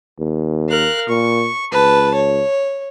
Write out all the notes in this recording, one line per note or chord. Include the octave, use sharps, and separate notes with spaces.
D#2
A#4 F5 F#6
A#2 C#6
C#2 B4 A5
C#5